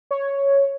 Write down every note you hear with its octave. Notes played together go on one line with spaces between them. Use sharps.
C#5